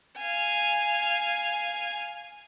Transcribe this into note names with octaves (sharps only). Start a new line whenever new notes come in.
F5 G#5